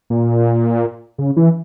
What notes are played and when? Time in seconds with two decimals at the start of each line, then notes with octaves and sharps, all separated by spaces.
0.10 A#2
1.18 C#3
1.37 E3